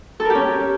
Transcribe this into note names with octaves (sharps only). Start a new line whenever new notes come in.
A4
A#4
G4
C#4